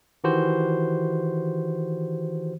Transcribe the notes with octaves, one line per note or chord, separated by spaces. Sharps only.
D#3 E3 F#4 G4 C5